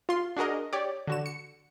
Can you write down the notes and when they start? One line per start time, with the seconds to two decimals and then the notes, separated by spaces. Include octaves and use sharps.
0.09 F4 C6
0.37 D4 F#4 G#4 A#4 D#5
0.73 G4 C#5 D5
1.07 D3 F#4 E7
1.26 C#7